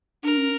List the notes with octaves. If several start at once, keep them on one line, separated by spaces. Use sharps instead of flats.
D4 A#4
C#4